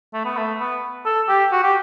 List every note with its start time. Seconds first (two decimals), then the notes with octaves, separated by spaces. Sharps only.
0.13 A3
0.25 B3
0.37 A3
0.60 B3
1.06 A4
1.29 G4
1.52 F#4
1.63 G4